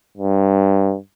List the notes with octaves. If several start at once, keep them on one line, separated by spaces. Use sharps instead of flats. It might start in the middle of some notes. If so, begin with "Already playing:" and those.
G2